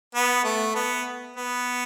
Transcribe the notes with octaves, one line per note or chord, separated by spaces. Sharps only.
B3
A3
B3
B3